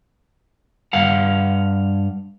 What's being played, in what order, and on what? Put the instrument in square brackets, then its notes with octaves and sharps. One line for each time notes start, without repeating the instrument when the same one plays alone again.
[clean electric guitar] G2 F5 F#5